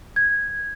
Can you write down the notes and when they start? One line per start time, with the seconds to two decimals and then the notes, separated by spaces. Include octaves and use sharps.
0.16 G#6